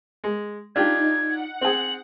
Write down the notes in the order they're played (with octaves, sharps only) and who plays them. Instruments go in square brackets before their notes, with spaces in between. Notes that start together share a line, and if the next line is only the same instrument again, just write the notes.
[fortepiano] G#3
[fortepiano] D4 F4 G4 [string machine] D#4 [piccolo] G#6
[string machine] F#5
[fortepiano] C4 G#4 [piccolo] F#7